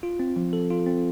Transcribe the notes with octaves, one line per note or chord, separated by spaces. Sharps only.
F4
C4
F3
A4
F4
C4